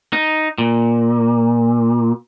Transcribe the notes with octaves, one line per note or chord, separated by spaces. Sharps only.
D#4
A#2